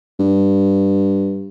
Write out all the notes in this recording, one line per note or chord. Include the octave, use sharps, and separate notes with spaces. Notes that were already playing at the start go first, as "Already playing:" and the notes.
G2